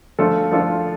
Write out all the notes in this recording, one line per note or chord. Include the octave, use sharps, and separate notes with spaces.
F3 A3 D4 F4 A4
F3 A3 D4 F4 A4